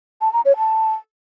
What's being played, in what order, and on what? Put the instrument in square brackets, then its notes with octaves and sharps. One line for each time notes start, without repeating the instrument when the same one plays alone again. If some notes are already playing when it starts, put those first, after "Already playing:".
[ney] A5
A#5
C#5
A5